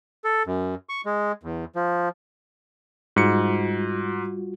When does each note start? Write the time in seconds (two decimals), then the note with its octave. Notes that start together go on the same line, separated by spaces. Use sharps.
0.24 A4
0.47 F#2
0.89 C#6
1.06 G#3
1.43 E2
1.76 F3
3.16 G#2 G3 F4 F#4 C#7